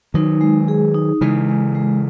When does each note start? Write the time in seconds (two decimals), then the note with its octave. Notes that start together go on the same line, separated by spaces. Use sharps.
0.14 D#3 F#3 D#4
0.41 G#3
0.68 G#4
0.94 D#4
1.21 C#3 E3 G#3
1.49 G#3
1.75 G#3